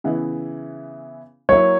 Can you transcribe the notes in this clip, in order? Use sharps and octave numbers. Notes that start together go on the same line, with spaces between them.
C#3 E3 B3 E4
F#3 A#3 E4 C#5